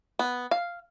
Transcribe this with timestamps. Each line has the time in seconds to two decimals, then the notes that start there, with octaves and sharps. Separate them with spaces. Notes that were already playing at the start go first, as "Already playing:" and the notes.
0.19 B3
0.51 F5